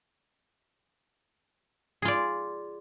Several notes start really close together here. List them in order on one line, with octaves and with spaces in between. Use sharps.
G#4 F4 D5